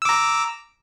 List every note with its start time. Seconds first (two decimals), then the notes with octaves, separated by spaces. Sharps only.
0.02 E6
0.05 D6
0.09 A#5